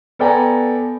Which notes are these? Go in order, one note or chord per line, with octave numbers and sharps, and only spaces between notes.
B3 A4 D5 G5 G#5 A#5